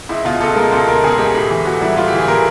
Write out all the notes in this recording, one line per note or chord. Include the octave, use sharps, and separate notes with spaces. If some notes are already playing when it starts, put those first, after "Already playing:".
C#2 E4
B2 F4
C#2 A4
G#3 A#4
C#2 A4
B2 A#4
C#2 G#4
G#3 G4
A2
E3
A2 F#4
G3 E4
A2 F4
E3 G4
G#4
A2 A#4